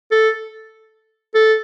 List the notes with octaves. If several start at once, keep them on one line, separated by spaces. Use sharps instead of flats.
A4
A4